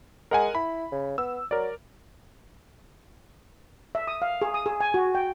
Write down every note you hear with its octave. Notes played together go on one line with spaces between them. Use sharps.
G#3 A#4 F#5 G#5
E4 B5
C#3
B3 E6
F#3 A#4 D5
E5
D#6
F5
G#4
D#6
G#4
G#5
F#4
G5